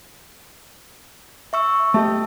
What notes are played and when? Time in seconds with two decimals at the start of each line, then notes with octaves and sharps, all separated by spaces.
1.53 E5 C#6 E6
1.94 A3 G4 D#5 E5 A5